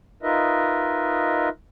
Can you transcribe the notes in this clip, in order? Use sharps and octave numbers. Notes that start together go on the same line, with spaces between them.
D#4 F4 A#4 B4 D#5 E5